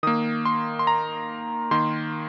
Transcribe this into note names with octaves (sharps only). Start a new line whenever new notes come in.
D#3 A#3 D#6
C6
C6
A#5
D#3 A#3 C6